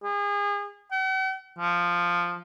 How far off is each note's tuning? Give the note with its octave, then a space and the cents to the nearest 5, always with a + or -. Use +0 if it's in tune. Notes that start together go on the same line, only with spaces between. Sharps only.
G#4 -35
F#5 +45
F3 +0